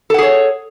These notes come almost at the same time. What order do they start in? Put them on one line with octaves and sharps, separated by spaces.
A4 F#5 G#4 C#5